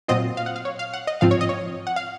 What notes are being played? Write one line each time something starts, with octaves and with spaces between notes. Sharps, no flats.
A#2 F#3 C4 F4 D#5
F5
F#5
F5
C#5
F5
F#5
D#5
G#2 F3 C4 F4 F5
C#5
D#5
C#5
F#5
F5